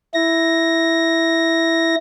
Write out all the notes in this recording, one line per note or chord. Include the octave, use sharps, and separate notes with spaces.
E4 A#6